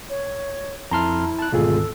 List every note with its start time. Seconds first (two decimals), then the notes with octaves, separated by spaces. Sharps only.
0.10 C#5
0.91 F2 E4 A5 A#5 C6 F6
1.39 A5 F#6
1.52 G#1 D2 B2 G#3 F4 G#4 A4